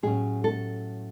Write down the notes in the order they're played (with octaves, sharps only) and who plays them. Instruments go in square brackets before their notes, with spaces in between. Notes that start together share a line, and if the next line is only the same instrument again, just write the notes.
[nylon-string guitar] A2 F#3 C#4 G#4
A4